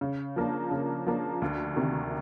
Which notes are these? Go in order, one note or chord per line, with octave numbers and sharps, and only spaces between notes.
C#3
F3 A#3 D4
C#3
F3 A#3 D4
D2
C3 D#3